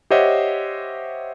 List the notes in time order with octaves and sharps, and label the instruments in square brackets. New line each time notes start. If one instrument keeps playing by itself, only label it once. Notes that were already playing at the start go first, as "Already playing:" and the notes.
[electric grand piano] G4 C5 C#5 D#5 E5 F#5